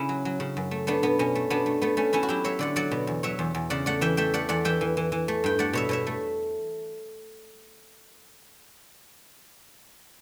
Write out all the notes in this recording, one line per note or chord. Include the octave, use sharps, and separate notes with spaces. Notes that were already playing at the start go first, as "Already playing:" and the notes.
Already playing: C#3 C#4 E4
F#3
F#3
C#3
F#2
A3
A3 B3 D4
B2 B3
B2 C#4
A3
B2 B3 D4
A3
A3 B3
A3 C#4
A3 C#4 E4
F#4
F#3 E4 G4
F#3 C#5 E5
D3 D5 F#5
F#3 D5 F#5
B2
E2
F#3 C#5 E5
E2
E2
C#3 D5 F#5
A3 D5 F#5
E3 E5 G5
A3 E5 G5
A3 D5 F#5
E2 D5 F#5
E3 E5 G5
E3
E3
E3
A3
G2 G5
A3 D5 F#5
B2 C#5 E5
B2 C#5 E5
A3